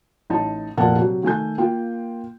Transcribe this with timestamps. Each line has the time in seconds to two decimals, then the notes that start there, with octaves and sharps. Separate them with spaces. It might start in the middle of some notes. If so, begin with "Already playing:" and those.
0.30 A1 D#4 A5
0.77 F1 A#2 C4 A#4 F#5 A5
0.96 C3 F#3
1.23 D#3 A3 G#5 G6
1.58 A#3 F4 G5